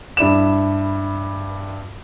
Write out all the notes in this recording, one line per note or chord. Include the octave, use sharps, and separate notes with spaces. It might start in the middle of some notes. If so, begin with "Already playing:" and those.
G2 E4 D5 E7